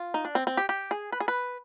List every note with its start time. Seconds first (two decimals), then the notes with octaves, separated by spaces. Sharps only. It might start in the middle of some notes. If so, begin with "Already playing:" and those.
Already playing: F4
0.14 D#4
0.25 D4
0.35 C4
0.47 C4
0.57 G4
0.69 G4
0.91 G#4
1.12 B4
1.20 G#4
1.28 B4